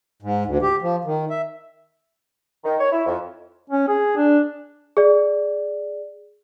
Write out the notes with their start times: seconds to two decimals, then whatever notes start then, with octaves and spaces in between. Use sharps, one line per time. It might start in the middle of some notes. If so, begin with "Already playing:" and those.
0.22 G#2
0.46 D2
0.62 G4
0.82 F3
1.04 D#3
1.30 E5
2.64 D#3
2.79 C#5
2.91 E4
3.07 F2
3.70 C#4
3.88 G#4
4.17 D4
4.97 G#4 D5